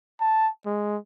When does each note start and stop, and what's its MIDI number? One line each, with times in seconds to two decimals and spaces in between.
0.20 0.49 81
0.66 0.97 56